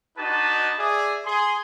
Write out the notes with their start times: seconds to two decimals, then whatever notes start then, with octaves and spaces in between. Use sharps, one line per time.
0.18 D4 D#4 F#4 B4 D#5 A5
0.79 G#4 D5 E5
1.26 G#4 C6